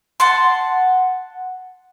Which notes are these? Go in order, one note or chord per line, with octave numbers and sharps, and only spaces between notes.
F#5 A5 C6